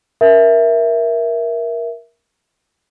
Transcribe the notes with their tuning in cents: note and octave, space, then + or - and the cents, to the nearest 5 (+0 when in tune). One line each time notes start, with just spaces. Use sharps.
A#4 +15 E5 +0